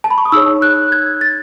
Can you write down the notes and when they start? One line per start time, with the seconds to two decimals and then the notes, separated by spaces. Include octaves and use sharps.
0.04 A5
0.10 B5
0.18 C#6
0.25 D#6
0.32 D#4 G#4 C#5 E6
0.62 F#6
0.92 G#6
1.21 A6